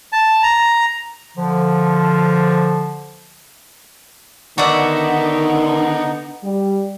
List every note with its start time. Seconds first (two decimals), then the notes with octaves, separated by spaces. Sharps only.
0.12 A5
0.43 A#5
1.37 D3 F3
4.58 D3 D#3 B3 D#4 F#4 D5 E5
6.44 G3